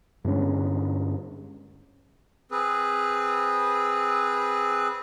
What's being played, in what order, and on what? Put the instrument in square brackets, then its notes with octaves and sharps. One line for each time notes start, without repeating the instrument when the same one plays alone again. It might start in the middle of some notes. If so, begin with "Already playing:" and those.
[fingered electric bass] G2 D3 G#3 C#4
[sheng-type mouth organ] C4 G#4 B4